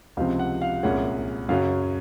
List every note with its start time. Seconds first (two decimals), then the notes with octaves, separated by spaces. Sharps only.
0.17 C#2 C3 F3 C4 F5
0.39 F#5
0.62 F5
0.83 C2 A#2 G#3 C#4 F#5
1.49 F#2 C#3 F#3 C#4 F5